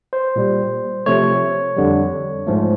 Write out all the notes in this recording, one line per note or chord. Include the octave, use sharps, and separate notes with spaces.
C5
A#2 G3
C3 F3 A3 C#5
F2 D3 G3
G#2 F3 A3